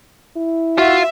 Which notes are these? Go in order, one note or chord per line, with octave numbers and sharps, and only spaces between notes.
E4
F4 F#4 E5